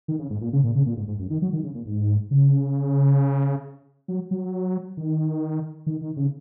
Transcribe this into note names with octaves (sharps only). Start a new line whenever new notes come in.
D#3
C#3
G#2
A#2
C#3
A#2
C#3
A#2
G#2
G#2
F#2
D#3
F#3
D#3
C#3
A#2
G#2
C#3
F#3
F#3
D#3
D#3
D#3
C#3